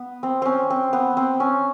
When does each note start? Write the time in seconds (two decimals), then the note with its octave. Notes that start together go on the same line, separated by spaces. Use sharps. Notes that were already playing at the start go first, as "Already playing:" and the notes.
Already playing: B3
0.23 C4
0.42 C4 C#4
0.70 C4
0.93 B3
1.17 C4
1.40 C#4